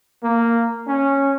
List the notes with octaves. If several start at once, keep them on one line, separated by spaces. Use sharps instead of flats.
A#3
C#4